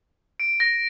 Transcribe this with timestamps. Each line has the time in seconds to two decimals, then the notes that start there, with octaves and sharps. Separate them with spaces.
0.40 D7
0.60 A#6